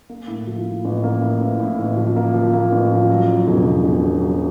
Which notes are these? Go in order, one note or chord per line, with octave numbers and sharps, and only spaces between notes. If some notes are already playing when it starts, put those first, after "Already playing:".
A#3
A2
F3
A2
A1
A#3
A2
A1
A2
A1
F3
A#3
F3
A#3
A1
F3
F#3
F#3
E1
E1
E1
F#3
F#3